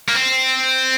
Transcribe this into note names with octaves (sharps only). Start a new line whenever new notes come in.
A#3
C4